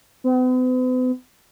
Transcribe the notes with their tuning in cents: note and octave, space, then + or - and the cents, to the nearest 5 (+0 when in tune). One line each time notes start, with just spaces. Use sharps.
B3 +45